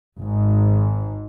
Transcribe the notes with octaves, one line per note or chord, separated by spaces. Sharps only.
G#1 G#2